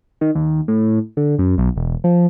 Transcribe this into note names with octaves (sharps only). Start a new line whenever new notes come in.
D#3
D#2
A2
D3
F#2
B1
E1
F3